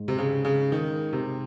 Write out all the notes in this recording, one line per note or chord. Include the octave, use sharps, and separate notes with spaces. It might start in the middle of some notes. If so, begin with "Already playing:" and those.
Already playing: G#2
C3
C#3
C#3
D#3
C3